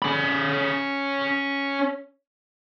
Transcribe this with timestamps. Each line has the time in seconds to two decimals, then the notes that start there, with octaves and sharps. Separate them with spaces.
0.02 C#4 B5